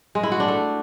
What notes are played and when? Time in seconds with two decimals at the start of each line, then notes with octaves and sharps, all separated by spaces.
0.15 G#3
0.23 E4
0.32 F#4
0.40 D4
0.48 A3